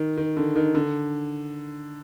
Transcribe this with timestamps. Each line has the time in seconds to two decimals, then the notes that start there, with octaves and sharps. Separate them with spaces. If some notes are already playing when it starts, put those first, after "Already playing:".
Already playing: D#3
0.18 D#3
0.37 D3
0.56 D#3
0.75 D3